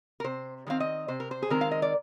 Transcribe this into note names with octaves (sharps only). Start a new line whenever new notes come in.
A#4
C3 C5
D#3 G#3 C4 F5
D#5
C3 C5
A#4
C5
G#4
D#3 G#3 C4 A#4
F5
D#5
D5